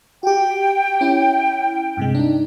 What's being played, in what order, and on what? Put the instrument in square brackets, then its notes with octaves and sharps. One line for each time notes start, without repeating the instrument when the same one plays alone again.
[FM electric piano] F#4 G4 [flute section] G5
[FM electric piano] C#4 E4
G2 C3 G#3
D4 D#4